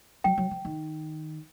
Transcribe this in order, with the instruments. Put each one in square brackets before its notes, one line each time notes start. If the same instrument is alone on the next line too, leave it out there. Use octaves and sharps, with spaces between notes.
[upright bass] F#3 [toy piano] G5
[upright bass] F#3
F3
D#3